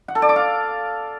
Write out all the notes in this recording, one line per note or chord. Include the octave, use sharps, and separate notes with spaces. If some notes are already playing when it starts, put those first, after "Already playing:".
F#5
A4
D5
D6
F5